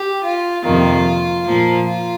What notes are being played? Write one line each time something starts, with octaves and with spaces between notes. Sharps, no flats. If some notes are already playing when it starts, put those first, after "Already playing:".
Already playing: G4
F4
F2 C3 D#3 A#3 F4
A#2 F3 A#3
F4